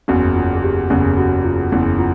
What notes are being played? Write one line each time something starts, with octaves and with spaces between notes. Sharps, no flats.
F#1 E2 C#3 F#4
F4
G#4
G4
F#1 E2 C#3 G#4
F#4
F4
F#1 E2 C#3 E4
F4